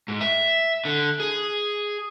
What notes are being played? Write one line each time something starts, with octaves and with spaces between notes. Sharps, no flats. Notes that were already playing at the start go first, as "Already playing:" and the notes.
G#2
E5
D3
G#4